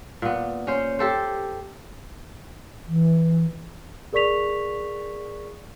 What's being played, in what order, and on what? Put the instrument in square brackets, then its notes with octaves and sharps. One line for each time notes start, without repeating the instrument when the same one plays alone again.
[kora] A#2 B3
C#4 C5
G4 A4 C5
[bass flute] E3
[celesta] G#4 A#4 D5 C#6 B6 F7